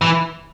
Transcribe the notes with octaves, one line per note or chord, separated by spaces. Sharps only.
E3